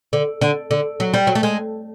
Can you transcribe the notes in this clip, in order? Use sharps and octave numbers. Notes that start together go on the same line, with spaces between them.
D3
D3
D3
F#3
G3
F#3
A3
G#3